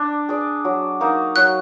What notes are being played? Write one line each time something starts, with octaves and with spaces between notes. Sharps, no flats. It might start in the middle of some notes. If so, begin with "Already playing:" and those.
Already playing: D4 D5
G#4 D5
F#3
A#3 D#4 F#4
F#3 F#6